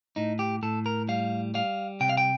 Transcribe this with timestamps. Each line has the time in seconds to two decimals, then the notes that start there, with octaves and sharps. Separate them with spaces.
0.16 A2 D#4
0.39 G4
0.63 A2 A4
0.86 A#4
1.09 G3 F5
1.54 G3 F5
2.00 C3 G5
2.09 F5
2.17 G5